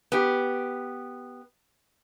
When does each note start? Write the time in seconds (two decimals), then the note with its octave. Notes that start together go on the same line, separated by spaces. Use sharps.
0.12 B3 G4